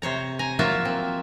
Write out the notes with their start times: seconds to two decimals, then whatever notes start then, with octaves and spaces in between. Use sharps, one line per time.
0.02 C3 C5 C#5 A#5
0.39 G#5 A#5
0.59 F3 F#3 A#3 F4 F#4 E5
0.85 C4